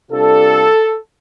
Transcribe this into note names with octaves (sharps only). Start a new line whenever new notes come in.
C3 G3 D4 F4 A4